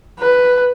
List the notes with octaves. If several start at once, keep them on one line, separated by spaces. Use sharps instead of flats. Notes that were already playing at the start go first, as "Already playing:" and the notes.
B4